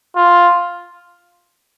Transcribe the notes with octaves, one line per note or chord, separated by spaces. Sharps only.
F4